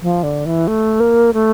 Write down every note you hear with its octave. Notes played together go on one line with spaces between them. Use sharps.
F3
D3
E3
A3
A#3
A3